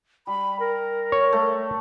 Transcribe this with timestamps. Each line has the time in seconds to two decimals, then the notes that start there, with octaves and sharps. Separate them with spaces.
0.27 G3 B5
0.60 A#4
1.12 C#5
1.33 A3